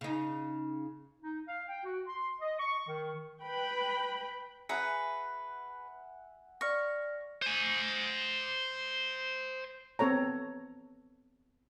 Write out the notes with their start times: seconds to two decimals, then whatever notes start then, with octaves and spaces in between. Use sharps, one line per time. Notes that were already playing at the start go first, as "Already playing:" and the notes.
0.01 C#3 D#4
1.21 D#4
1.47 F5
1.68 G5
1.83 F#4
2.07 C6
2.40 D#5
2.59 C#6
2.87 D#3
3.43 B4 G5 B5
4.69 G#4 B4 E5 F#5 G#5 A#5 C#7
6.61 D5 C#6 F6 A#6
7.42 C5 G#5
9.99 B3 C4 A4 C#5 A#5